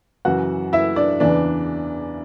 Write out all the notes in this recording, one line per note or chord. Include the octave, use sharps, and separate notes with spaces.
F#2 C#3 E3 F#4 F#5
E4 E5
D4 D5
E2 C#3 E3 D4 D5